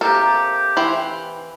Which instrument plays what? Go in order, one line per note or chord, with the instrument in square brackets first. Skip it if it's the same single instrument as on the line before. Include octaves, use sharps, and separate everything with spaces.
[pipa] C3 A#3 [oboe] G4 [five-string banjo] A4
[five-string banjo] E3 C5 G5